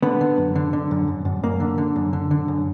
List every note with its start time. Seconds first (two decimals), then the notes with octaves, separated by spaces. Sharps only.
0.03 D3 B3
0.21 D3
0.38 F#2
0.55 D3
0.73 D3
0.91 F#2
1.08 F#2
1.25 F#2
1.43 F#2 A#3
1.60 D3
1.78 D3
1.96 F#2
2.13 D3
2.31 D3
2.48 F#2